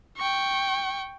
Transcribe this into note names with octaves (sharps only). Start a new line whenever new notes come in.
G5 C#6